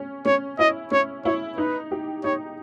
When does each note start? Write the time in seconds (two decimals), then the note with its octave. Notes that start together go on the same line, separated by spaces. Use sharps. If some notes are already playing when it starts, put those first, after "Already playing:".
Already playing: C#4
0.25 C#4 C#5
0.59 E4 D#5
0.91 C#4 C#5
1.25 E4 C#5
1.58 D#4 B4
1.91 G4
2.24 D#4 C#5